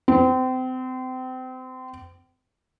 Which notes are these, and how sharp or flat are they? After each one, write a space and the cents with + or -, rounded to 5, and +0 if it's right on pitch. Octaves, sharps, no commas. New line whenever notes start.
C4 -30